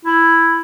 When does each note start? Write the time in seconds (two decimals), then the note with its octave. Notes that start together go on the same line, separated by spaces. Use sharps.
0.05 E4